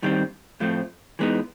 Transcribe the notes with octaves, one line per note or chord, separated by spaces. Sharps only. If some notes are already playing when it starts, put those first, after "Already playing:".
G2 D#3 G3 C4
A2 F3 A3 C4
E3 G#3 B3 D#4